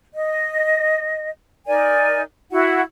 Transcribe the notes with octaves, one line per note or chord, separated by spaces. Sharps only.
D#5
D#4 A#4 D5 G#5
E4 F#4 F#5